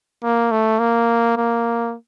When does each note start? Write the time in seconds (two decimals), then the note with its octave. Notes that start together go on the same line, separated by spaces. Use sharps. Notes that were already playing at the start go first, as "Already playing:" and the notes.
0.23 A#3
0.51 A3
0.79 A#3
1.37 A#3